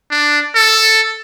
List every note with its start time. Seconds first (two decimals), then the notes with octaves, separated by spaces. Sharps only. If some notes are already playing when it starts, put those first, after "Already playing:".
0.11 D4
0.55 A4